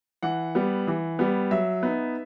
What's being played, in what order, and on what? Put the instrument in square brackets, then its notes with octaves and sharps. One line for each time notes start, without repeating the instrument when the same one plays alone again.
[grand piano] E3 F#5
G3 B3
E3
G3 B3
F#3 E5
B3 D#4